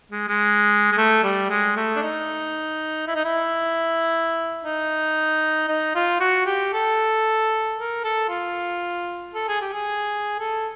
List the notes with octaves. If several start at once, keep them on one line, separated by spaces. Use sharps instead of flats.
G#3
G#3
G#3
A3
G3
G#3
A3
D4
D#4
E4
D#4
E4
D#4
D#4
F4
F#4
G4
A4
A#4
A4
F4
A4
G#4
G4
G#4
A4